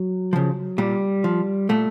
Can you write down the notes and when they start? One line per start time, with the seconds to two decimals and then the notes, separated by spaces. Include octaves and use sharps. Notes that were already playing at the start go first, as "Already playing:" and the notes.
Already playing: F#3
0.33 C#3 F3
0.78 A#2 G3
1.24 F3
1.69 A#2 A3